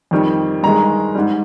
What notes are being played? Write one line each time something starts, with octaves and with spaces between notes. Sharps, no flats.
F2 D#3 G3
G2 D#3 G#3 A#5
G#2 G3